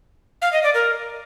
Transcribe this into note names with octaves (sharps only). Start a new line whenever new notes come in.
F5
D#5
D5
A#4